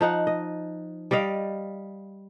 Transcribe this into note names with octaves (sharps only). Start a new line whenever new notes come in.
F3 D#4 F#5
D#5
G3 D5 D#5 F5